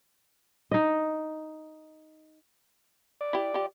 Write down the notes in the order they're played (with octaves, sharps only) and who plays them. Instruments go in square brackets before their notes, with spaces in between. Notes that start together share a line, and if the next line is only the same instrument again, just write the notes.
[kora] D#4 D#5
[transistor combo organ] D5
[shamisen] E4 G4
F3 G4